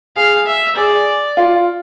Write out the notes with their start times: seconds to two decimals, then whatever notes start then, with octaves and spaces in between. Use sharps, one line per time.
0.16 G#4 F5
0.46 E5
0.76 G#4 D5
1.37 F4